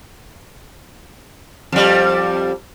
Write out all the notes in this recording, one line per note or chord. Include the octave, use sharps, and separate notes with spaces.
F2 G3